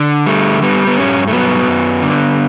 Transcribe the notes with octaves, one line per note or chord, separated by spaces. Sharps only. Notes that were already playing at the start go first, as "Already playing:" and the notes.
Already playing: D3
G3 A3
G3 B3
B3
G2 C#4
A3
F#3 B3
F#2
D3